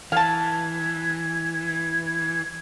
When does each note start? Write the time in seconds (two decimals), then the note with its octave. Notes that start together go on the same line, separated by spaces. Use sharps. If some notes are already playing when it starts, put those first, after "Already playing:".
0.12 E3 F5 A5 G#6